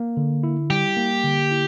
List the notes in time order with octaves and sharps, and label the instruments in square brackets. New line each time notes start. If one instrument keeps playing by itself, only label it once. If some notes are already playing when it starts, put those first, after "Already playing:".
Already playing: [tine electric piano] A#3
D3
E4
[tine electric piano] G3 [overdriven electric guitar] G4
[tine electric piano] A#3
D3
E4